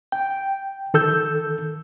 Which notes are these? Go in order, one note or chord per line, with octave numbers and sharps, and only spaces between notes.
G5
D#3 A4 E6 G6